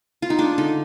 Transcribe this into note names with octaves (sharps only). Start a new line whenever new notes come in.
F4
D#4
G#3 D4
D3 D#4